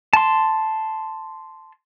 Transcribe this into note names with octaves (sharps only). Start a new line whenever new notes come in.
A5 C6